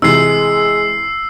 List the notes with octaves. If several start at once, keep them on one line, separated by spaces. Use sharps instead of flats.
C3 E3 G#3 E6 C7